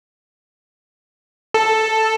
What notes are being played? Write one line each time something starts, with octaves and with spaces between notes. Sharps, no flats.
A4